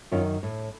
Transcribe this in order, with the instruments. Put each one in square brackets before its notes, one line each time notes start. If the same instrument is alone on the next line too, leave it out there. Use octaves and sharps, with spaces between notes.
[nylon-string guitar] F#2 D#3 C#4 F4
A2